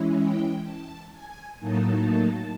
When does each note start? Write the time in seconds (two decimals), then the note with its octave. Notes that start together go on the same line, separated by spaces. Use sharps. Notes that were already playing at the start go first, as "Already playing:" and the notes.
Already playing: E3 G#3 C#4 E4
0.16 G5
0.64 A5
1.12 G#5
1.59 A2 F#3 A#3 D#4 A5